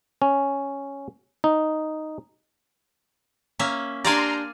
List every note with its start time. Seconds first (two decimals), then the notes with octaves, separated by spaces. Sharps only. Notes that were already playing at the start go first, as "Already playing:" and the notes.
0.22 C#4
1.44 D#4
3.59 A#3 C#4 E5
4.04 D4 G4 D5 F5 G#5 A#5 C6